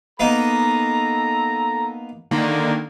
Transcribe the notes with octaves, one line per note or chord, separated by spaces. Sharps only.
A#3 B3 D#4 A4 A#5
D3 D#3 A#3